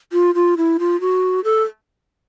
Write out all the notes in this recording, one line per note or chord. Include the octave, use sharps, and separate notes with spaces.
F4
F4
E4
F4
F#4
A4